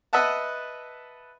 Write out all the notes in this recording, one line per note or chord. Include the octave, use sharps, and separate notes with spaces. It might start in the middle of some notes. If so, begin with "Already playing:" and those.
B4 D#5 E5 F#5 A5